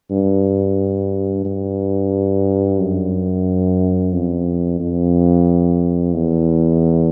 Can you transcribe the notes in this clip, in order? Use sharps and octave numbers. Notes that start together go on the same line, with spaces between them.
G2
G2
F#2
F2
F2
E2